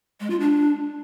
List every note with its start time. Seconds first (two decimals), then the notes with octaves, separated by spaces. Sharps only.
0.20 G#3
0.30 F4
0.40 D4